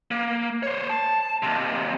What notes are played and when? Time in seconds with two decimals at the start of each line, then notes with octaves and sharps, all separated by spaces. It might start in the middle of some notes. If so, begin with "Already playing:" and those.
0.11 A#3
0.63 C5 C#5
0.89 A5
1.43 D#2 C3